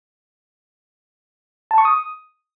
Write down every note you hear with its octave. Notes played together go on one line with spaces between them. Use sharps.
A5
C#6
D#6